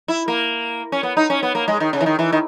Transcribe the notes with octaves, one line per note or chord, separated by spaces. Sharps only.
E4
A#3
C#4
B3
D#4
C#4
B3
A#3
G#3
D#3
C#3
E3
D#3
E3
D#3